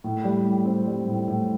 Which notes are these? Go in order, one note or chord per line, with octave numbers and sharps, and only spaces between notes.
A2
G3
A2
C4
G3
A2
A2